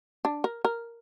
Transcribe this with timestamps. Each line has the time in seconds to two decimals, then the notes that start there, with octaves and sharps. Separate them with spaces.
0.25 D4
0.44 A#4
0.65 A#4